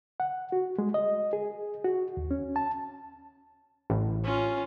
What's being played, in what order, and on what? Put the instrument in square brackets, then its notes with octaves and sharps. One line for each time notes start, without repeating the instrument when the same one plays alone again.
[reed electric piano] F#5
F#4
G#3
D#5
G#4
F#4
D#2
C#4
A5
[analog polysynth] A1
[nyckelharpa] C#4 F4